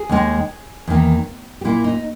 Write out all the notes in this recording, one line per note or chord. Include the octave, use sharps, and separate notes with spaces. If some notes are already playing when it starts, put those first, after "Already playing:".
Already playing: G#4
D#2 D#3 G#3
E2 D#3 A#3
G4
A#2 A#3 E4
D#4